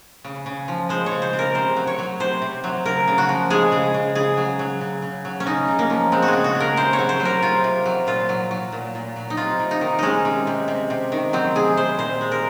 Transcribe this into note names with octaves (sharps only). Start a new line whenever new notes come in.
C#3
C#3
F3
G#3 C5
C#5
C#3
C5
C#3
A#4
C3 C5
F#3
C#5
F#3
C3 C5
C3
F#3
C#3 A#4
C#3
F#4
F3
G#3 G#4
C#3
C#3
C#3 G#4
F#3
F#3
C#3
C#3
F#3
C#4
C#3 D#4
C#3
A#3
F3
G#3 C4
F#4
G#4
C#3
F#4
C#3
A#4
C3 C5
C#5
F#3
C5
F#3
A#4
C3 F4
C3
F#3
A#2 F4
F#3
F#3
A#2
A#2
F#3
D#4
C3 F4
C3
D#4
D#3
G#3 C#4 D#4
C3
C3
C3
C3
D#3
F#3 C4
C3 G#4
C3 C5
A#2 C5
G#3
A#4